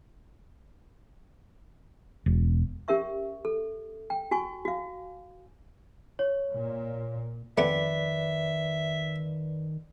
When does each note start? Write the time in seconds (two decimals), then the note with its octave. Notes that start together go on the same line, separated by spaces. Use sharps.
2.26 E1
2.88 C#4 G4 A#4 E5 C#6
3.45 A4
4.10 G5
4.31 F#4 G#5 C#6
4.65 F#4 F5
6.19 C#5
6.52 A#2
7.58 F2 D#3 A3 B3 C4 B4 D5 E5